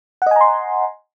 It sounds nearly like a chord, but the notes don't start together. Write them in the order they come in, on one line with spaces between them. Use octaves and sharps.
F#5 D#5 G#5 A#5 C6